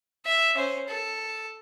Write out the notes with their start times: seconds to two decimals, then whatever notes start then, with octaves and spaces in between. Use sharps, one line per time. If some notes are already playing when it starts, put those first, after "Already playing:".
0.25 E5
0.55 C#4 C5
0.88 A4